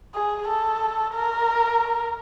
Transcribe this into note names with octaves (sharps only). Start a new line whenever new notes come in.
G#4
A4
A#4